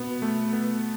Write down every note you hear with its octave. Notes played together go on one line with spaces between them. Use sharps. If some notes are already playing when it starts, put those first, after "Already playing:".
Already playing: B2 B3
A3
B3